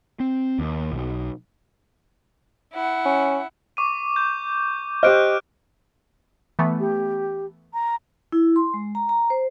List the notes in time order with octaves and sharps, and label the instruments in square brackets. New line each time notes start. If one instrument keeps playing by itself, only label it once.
[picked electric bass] C4
D#2
B1
[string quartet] E4 F#5
[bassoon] C#4
[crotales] C#6 D6 D#7
G6
[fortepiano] G4 C5 D#5 [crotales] F6 F#6 D7
[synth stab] E3 A3 B3
[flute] G4
A#5
[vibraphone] E4
C6
G#3
A#5
A#5
C5